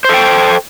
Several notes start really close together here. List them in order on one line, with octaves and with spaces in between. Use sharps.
C5 A4 G5